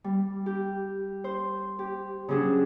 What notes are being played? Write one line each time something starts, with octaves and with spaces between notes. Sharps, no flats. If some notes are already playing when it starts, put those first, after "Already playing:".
G3
G4
C5
G4
C#3 F#3 D4 G#4